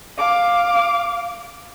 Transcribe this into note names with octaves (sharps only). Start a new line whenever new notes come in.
F5 D6